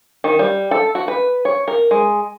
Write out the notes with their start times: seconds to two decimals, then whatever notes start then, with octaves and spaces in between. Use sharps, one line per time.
0.24 D#3
0.39 G3
0.71 A4
0.95 F#4
1.08 B4
1.45 C#5
1.68 A#4
1.91 G#3